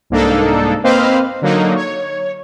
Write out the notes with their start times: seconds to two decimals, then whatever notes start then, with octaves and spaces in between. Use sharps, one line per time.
0.10 C2 G#2 A#3 D4 D#4 A4
0.84 A#3 C4 B4 C5 D#5 F5
1.42 D3 F#3 A#3 D#4
1.75 C#5